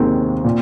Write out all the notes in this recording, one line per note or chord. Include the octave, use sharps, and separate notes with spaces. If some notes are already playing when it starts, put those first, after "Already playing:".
Already playing: D#2 D#3 G#3 A#3 C4
A#2